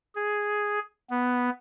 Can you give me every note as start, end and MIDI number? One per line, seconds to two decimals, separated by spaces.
0.15 0.79 68
1.10 1.50 59